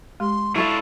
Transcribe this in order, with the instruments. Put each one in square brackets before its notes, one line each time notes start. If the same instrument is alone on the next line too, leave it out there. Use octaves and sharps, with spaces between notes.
[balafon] G#3 G4 [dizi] C6
[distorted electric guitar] D4 F4 [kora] E4 A4 E5 [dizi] C#6